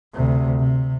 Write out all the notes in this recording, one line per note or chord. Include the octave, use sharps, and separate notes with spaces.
D2 C3
C3